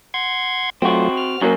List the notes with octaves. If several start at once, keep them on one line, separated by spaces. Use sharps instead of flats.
F#5 C6 G#6
F#3 A3 C4 F4 F#4
F6
F#2 F#3 A#3